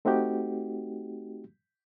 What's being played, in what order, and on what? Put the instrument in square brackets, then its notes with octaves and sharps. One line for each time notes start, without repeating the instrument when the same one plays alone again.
[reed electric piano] A3 C4 D#4 F#4 G4